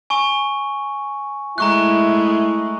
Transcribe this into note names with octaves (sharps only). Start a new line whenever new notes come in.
G#5 C#6
G#3 A3 E4 A#5 C#6 F#6